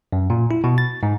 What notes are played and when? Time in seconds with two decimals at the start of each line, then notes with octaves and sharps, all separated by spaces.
0.12 F#2
0.30 A#2
0.51 E4
0.64 B2
0.78 A6
1.03 G#2